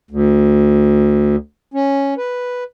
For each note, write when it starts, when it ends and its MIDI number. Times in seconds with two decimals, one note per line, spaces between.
0.11 1.36 38
1.74 2.14 61
2.17 2.64 71